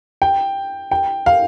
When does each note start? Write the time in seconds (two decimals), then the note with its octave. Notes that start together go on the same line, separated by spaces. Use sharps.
0.22 G5
0.91 G5
1.26 F5